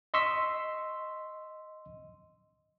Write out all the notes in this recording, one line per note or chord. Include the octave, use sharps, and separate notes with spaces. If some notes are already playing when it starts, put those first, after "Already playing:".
D#5 C6 C#6 E6 B6